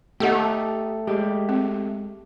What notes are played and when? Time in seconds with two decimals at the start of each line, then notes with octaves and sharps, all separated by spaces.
0.20 A3 B3 D#4 G4 A4 F#5
1.07 G#3 G4
1.49 C4